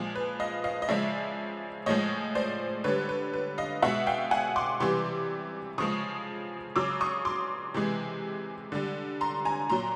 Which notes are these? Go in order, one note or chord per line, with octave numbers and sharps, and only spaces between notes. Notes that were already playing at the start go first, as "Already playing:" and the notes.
Already playing: A#2 F3 G#3
B4
D#5 F5
D#5 F5
D#5
C#3 F3 G#3 D5 E5
A2 F3 G#3 C#5 D#5
C5 D5
D3 G3 B4 C#5
B4
B4
D#5 F5
B2 G#3 E5 F#5
F5 G5
F#5 G#5
C6 D6
C3 E3 G3 C6 D6
C#3 F3 G#3 C#6 D#6
C#3 F#3 D6 E6
C#6 D#6
C6 D6
C3 E3 G#3
D3 G3
A#5 C6
G#5 A#5
A#2 F#3 A#5 C6